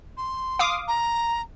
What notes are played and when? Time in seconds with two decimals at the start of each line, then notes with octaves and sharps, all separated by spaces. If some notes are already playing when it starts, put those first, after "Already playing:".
0.17 C6
0.59 F5 D6 D#6
0.88 A#5